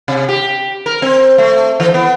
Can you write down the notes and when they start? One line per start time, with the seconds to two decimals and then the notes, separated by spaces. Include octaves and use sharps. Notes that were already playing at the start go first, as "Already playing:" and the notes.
0.08 C3
0.29 G4
0.86 A#4
1.02 C4
1.38 A3
1.80 E3
1.94 B3